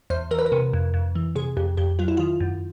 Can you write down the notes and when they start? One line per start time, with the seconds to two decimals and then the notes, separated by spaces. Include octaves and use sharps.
0.10 E2 C5
0.31 E3 A#4
0.39 B4
0.46 A#4
0.52 C3
0.73 F2
0.94 F2
1.15 E3
1.36 C3 G#4
1.57 F2 G4
1.77 F2 G4
1.99 F#3 F4
2.08 E4
2.17 D#3 F4
2.40 F#2